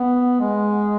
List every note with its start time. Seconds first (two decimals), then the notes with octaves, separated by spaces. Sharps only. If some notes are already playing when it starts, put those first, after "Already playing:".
Already playing: B3
0.40 G#3